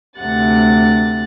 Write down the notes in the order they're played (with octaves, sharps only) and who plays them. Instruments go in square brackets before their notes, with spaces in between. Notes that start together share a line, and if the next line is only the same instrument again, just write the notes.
[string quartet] D2 C3 F#5 A6